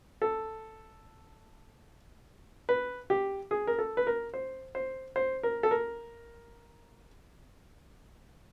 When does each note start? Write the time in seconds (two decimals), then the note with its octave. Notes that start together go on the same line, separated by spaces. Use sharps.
0.22 A4
2.69 B4
3.10 G4
3.51 G#4
3.67 A#4
3.79 A4
3.97 B4
4.07 A#4
4.34 C5
4.75 C5
5.16 C5
5.43 A#4
5.63 A4
5.71 A#4